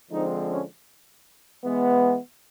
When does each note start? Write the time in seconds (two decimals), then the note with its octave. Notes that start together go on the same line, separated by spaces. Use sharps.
0.10 D3 F3 G#3 C4 D#4
0.49 C#4
1.64 E3 G#3 B3